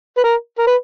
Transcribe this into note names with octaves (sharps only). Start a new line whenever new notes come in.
B4
A#4
A#4
B4